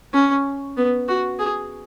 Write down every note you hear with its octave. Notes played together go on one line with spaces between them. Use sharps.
C#4
B3
F#4
G#4